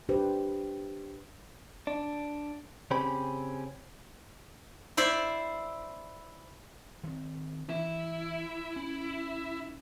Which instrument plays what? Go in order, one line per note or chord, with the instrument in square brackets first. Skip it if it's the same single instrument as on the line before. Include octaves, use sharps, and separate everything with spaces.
[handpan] D4 G4 B4 C5
[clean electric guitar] D4
C#3 C4 C#4 G4 C5 B5
[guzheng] E4 C5 D5 E5
[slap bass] D#3 C4
[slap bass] E3 [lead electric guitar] E4
[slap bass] C#4